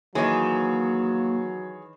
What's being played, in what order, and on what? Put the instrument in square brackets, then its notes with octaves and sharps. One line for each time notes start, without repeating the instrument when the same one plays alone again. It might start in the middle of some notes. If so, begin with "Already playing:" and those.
[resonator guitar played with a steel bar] D#3 E3 [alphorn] F#3 [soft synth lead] A#3 [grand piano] G#4 C#5